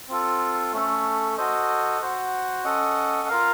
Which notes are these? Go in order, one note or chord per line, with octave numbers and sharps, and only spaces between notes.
C4 F4 A4
A3 C#4 A4
F#4 A4 C5 D#5
F#4 C5 F#5
C#4 A4 D#5 F#5
F4 A#4 F5